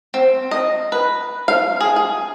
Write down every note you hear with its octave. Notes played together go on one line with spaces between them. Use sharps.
C4
D#5
B4
F5
G#4
G#4